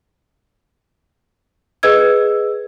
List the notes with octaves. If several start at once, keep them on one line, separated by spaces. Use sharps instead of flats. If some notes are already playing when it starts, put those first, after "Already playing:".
G#4 B4 D#5 E6 G#6